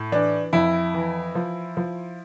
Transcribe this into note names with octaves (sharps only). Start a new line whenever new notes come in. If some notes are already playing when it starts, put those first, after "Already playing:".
Already playing: A2
E3 D4
F2 E4
E3
F3
F3